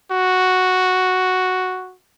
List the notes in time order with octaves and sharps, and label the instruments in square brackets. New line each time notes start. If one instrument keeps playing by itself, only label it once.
[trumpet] F#4